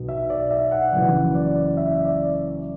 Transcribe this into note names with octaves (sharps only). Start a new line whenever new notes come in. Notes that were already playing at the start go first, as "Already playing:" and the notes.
Already playing: B1 B2 B3
E5
D5
E5
F#5
F#1 F#2 E3 F#5
D5
E5
D5